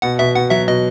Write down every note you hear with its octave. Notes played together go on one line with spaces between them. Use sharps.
B2 F#5
B2 E5
B2 F#5
F#3 E5
B2 D#5